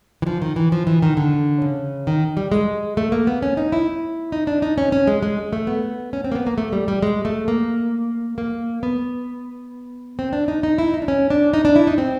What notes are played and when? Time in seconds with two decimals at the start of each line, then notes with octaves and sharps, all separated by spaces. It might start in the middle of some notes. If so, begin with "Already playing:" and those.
0.22 E3
0.27 F3
0.42 D#3
0.56 E3
0.72 F3
0.87 E3
1.02 D#3
1.17 D3
1.62 C#3
2.07 D#3
2.37 G3
2.52 G#3
2.97 A3
3.12 A#3
3.27 B3
3.42 C#4
3.57 D#4
3.72 E4
4.32 D#4
4.47 D4
4.62 D#4
4.78 C#4
4.92 C#4
5.07 G#3
5.23 G#3
5.53 A3
5.67 B3
6.13 C#4
6.24 C4
6.32 A#3
6.35 B3
6.47 A#3
6.58 A3
6.72 G3
6.88 G3
7.02 G#3
7.25 A3
7.48 A#3
8.38 A#3
8.83 B3
10.19 C4
10.33 D4
10.48 D#4
10.63 D#4
10.78 E4
10.94 D#4
11.02 D4
11.08 C#4
11.30 D4
11.54 D#4
11.65 D4
11.76 E4
11.87 D#4
11.98 C4